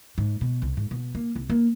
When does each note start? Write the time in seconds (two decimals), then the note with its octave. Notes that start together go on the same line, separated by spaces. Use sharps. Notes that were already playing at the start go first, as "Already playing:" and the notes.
0.18 G#2
0.41 B2
0.62 C2
0.77 G#2
0.91 B2
1.15 A#3
1.36 C2
1.50 A#3